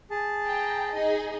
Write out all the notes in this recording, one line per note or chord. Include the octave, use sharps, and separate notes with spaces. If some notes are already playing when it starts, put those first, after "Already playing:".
G#4 A5
G5 A#5
D#4 G#4 D#5